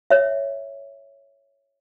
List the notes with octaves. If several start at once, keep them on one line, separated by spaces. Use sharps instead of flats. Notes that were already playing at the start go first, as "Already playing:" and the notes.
C#5 E5